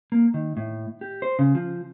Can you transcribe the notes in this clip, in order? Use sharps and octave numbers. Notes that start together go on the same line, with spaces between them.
A#3
D#3
A2
G4
C5
C#3
F3